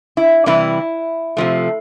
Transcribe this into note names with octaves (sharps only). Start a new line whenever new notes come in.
E4
C3 E3 G3 E4
C3 F3 A3